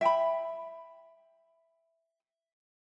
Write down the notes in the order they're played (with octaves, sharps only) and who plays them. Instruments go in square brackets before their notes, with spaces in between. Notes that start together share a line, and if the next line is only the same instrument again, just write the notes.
[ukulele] E5 G5 A5 B5